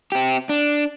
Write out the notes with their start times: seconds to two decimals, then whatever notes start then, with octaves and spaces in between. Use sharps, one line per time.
0.12 C4 G4
0.49 D4